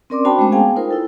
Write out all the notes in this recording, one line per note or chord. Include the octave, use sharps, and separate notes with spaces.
C4 C#4 A#4 D5 C6 D6
D4 F#4 C5 G5 A5 B5
G#3 A3 C4 C#4 C5
B3 G#4 F5 G5 G#5
D#4 F4 A#4 C5
E4 A4